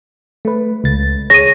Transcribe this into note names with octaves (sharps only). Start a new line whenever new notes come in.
A3 B4
C#2 A6
G#4 C#5 A#6 D#7